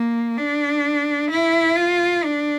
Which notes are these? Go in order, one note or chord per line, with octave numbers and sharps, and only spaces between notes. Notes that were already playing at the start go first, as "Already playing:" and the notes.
Already playing: A#3
D4
E4
F4
D4